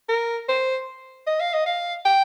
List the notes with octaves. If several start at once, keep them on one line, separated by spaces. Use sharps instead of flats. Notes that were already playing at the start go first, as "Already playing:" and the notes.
A#4
C5
D#5
F5
D#5
F5
G5